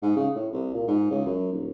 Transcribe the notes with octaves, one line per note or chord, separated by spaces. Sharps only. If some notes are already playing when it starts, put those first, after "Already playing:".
G#2
C#3
A2
C2
A#2
G#2
C#2
F#2
D#1